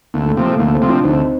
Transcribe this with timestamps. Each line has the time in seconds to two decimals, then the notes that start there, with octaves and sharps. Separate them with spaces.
0.14 D2 A#3
0.26 A3
0.37 C3 F3 A#3
0.48 A3
0.59 D2 A#3
0.74 A3 C4
0.82 C3 F3
0.89 D4 F4
1.04 D2 C4 D#4